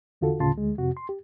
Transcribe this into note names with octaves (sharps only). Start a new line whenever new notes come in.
E2 D3 F4 F#4 A4
D2 A2 C#3 F4 A5 C6
D2 G#3
F2 C3 F#4
C6
G4